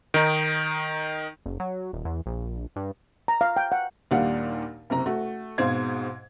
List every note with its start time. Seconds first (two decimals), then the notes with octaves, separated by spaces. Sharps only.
0.14 D#3 D#4
1.46 F#1
1.60 F#3
1.93 D#1
2.05 E2
2.26 A#1
2.76 G2
3.28 A#5
3.41 F5
3.57 G5
3.72 F#5
4.11 D#2 A#2 G3 D4 F5 F#5
4.90 F#1 C3 A#5
5.06 A3 F#4
5.58 G#2 B2 C4 C5 F5 G#6